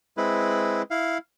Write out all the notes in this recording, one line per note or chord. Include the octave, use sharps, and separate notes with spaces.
G#3 C4 E4 B4
E4 F5